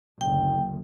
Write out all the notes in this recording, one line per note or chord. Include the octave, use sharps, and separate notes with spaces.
F#1 D2 G5